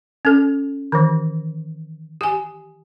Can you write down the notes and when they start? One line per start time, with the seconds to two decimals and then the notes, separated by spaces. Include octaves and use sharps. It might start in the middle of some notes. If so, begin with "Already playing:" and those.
0.25 C#4 A4
0.92 D#3 E3
2.21 G4 G#5